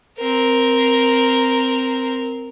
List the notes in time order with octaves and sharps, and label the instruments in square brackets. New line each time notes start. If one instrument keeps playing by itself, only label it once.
[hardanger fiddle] C4 A#4